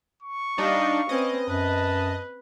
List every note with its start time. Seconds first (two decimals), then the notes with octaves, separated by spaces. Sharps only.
0.22 C#6
0.58 G3 D4 D#4 D#5 F5
1.09 C4 C#4 B4 D#5
1.48 F#2 B4 A5